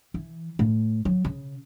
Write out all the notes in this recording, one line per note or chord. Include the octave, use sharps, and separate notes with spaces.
E3
A2
F#3
C#3